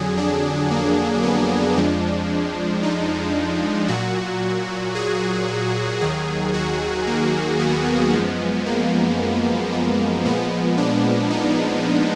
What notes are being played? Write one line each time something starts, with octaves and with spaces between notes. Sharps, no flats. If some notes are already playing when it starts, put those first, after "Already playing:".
Already playing: F2 D3 F#3 G#4
D4
A#3
B3
F2 F3 G#3 D4
D#4
A#2 F#3 F#4
G#4
D#2 D#3 F#3 G#4
F#4
A#3
B3
F#2 F3 G#3
A#3
B3
A#2 F3 G#3 B3
D4
D#4